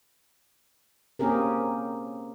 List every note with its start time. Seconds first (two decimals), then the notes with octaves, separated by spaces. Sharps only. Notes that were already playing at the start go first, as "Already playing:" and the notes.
1.19 A#3 C4 C#4 G4 G#4 A#4